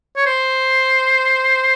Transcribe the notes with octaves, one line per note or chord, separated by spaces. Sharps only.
C#5
C5